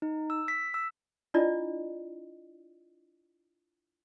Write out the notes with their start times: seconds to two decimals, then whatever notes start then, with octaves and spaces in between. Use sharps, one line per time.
0.02 D#4
0.30 E6
0.48 B6
0.74 E6
1.34 D4 E4 F4 D5 D#5